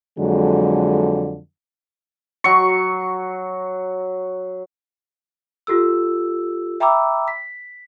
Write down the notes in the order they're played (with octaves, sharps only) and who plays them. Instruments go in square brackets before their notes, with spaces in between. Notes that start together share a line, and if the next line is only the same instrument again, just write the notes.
[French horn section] F2 D3 F#3 G#3
[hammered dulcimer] F#3 C#6
[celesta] F4 G4 A4 E6
E5 G5 A#5 B5 D6 E6
B6